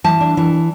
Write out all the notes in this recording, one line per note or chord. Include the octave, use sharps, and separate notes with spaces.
E3 A5
D4
E3